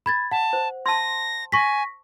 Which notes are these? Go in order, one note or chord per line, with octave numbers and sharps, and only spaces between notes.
B5 G#6 A6
F#5 A5
C5
A5 C6 A#6
G#5 C#6 A#6 B6